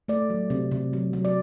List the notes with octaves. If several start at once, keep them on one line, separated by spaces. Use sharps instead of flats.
A3 D5
F#3
C3
C3
F#3
F#3
D5